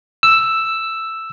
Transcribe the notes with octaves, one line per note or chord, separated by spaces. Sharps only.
E6